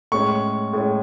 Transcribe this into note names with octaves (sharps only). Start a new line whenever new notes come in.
A2 G#3 C#4 C#6
A2 G#3 C#4